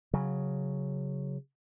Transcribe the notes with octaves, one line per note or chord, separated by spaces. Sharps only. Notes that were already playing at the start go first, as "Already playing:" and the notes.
C#3 F#3